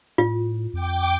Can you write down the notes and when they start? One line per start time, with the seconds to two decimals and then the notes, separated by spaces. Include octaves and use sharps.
0.18 A2 F4
0.74 F2 G5 D6